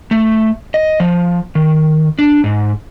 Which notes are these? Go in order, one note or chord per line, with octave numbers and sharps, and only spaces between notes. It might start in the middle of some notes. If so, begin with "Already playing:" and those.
A3
D#5
F3
D#3
D4
G#2